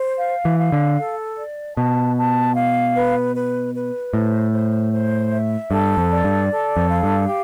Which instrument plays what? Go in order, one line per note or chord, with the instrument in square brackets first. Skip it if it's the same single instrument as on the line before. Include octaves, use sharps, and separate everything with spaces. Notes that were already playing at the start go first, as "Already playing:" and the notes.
Already playing: [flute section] C5
F5
[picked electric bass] E3
[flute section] F5
[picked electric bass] D3
[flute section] A4
D5
[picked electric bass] B2 [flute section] A5
[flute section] A5
F5
B4
B4
B4
[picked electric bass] A2 [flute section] C5
[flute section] C5
C5
E5
[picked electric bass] G2 [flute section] A4
[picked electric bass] F2
[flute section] D5
[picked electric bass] G2
[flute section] A4
[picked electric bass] F2
[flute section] F5
[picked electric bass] G2
[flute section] G4